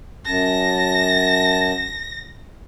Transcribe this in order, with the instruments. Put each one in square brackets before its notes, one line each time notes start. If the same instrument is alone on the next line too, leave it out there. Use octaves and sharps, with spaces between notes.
[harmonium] F#2 A5 [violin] A#6